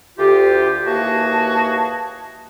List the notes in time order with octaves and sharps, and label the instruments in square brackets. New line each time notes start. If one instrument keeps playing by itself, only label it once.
[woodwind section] D2 F4 G4
D#2 E3 A#3 F#4 G#4 A5